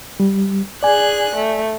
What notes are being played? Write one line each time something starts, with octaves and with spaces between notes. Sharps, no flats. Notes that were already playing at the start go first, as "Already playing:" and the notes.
G3
G#4 D5 G#5 F#6
A3